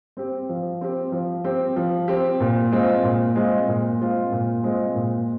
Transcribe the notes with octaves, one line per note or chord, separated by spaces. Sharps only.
C4 G4
F3
C4 G4
F3
C4 G4
F3
C4 G4
A#2
G#3 C4 F4
A#2
G#3 C4 F4
A#2
G#3 C4 F4
A#2
G#3 C4 F4
A#2